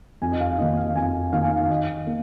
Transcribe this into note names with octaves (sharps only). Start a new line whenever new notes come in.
F2 G#5
D#5
F5
D#3 A#3 D#4 D#5
F5
F2 G#5
D#3 A#3 D#4 F5
G#5
F5
D#3 D#5
A#3